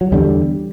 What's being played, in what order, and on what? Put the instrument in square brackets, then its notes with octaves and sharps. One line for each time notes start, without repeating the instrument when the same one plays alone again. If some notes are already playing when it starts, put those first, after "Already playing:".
[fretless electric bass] F#3
E2 D3 G3